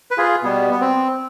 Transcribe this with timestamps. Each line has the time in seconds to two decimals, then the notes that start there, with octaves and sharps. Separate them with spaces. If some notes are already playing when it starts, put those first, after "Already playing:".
0.11 B4
0.17 F4 G#4
0.43 B2 G3 B3
0.70 B3
0.81 C4